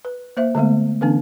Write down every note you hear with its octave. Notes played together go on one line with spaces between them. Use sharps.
B4
A#3 C5 E5
D3 G#3 A3 B3
D3 E3 B3 C#4 D4